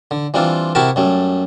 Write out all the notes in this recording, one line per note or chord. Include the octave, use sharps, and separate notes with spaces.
D3
E3 G3 C4 D4 F4
C3 E4 F#4 G4 A#4 A5
F#2 G3 A3